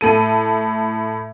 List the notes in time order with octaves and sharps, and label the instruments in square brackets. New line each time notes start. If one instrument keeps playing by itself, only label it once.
[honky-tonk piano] A2 A4 D#7